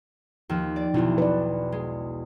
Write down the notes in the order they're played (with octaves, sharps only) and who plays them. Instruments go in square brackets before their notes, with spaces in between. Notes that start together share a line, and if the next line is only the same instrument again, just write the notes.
[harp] D#2 F3
D5
[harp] B1 E2 [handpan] B2 E4
[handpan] B4 D5
[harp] G#3